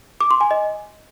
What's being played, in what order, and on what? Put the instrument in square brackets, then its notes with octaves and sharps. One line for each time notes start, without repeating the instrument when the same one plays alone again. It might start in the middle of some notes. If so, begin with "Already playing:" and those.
[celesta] D6
C6
G#5
D#5